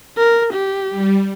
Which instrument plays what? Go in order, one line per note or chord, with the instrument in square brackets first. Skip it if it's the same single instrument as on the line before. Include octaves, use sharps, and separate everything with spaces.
[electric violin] A#4
G4
[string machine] G3